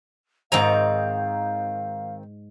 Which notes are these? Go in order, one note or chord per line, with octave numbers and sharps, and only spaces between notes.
G#2 D#3 C4 F5 G#5 A#5